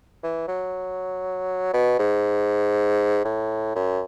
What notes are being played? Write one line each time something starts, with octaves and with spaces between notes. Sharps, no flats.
E3
F#3
B2
G#2
A2
F#2